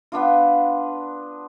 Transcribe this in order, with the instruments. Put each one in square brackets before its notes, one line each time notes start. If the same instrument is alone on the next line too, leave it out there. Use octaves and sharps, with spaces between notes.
[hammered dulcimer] B3 D4 F4